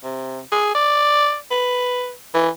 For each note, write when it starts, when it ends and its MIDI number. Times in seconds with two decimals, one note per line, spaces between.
0.04 0.40 48
0.52 0.72 68
0.75 1.36 74
1.51 2.12 71
2.34 2.49 52